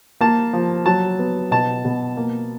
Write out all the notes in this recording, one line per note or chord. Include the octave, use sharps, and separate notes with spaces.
A#3 A5
F3
F#3 A5
B3
B2 A5
B2
A#3